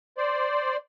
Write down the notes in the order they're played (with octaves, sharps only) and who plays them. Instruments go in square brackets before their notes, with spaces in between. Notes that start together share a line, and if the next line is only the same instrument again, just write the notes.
[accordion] C5 D5